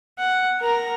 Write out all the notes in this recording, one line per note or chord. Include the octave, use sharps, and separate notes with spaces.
F#5
A#4 A#5